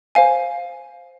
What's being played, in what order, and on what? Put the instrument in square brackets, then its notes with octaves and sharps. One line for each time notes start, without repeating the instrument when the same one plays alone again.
[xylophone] C5 F5 G#5